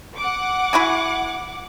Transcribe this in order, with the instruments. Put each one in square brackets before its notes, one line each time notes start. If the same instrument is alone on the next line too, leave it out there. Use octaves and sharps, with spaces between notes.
[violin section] F#5 D6
[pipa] E4 F#4 G#4